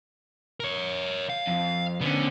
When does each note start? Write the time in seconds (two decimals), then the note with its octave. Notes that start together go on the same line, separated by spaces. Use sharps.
0.60 A#4 C#5
1.30 F5
1.47 F2
2.01 D3 B3 C#4